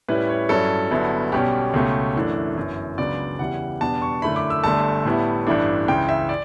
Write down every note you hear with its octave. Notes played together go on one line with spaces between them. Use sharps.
A2 G3 C#4 E4 B4
C#5
G2 F#3 C#4 E4 A4
G1 G2 F#3 B3 E4
B1 B2 G3 C#4 G4
C#2 B2 A3 C#4
F#2 E3 A3 D4
G1 F#2 E3
C#2 C#3 F#3 B3 D4 D5
E2 C#3 E3 G3 F#5
E2 B2 G3 B3 D4 A5
C#6
F#2 D3 A3 E4 B5
D6
E6
G1 G2 D3 A3 A5
A2 G3 B3 E4
A1 G2 E3 A3 D4
C#2 C#3 E3 G5
E5
D5